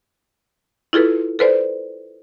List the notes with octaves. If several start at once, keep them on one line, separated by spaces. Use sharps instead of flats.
E4 F4 G#4 A4 B4
A4 B4 C5 D5